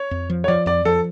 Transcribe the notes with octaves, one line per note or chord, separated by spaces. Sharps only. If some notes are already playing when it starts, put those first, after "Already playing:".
Already playing: C#5
F2
F3
C#5
F3 D5
F2 D5
F3 A4